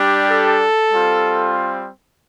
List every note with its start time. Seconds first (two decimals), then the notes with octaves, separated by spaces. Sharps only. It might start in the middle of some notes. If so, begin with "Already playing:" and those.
Already playing: G3 D4 G4
0.31 A4
0.91 G3 C4 F4